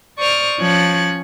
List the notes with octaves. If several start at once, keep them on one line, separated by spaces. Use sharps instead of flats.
C5 D5 C#6 D#6 F6
F3 C#4 C#5 G#5 F#6 A6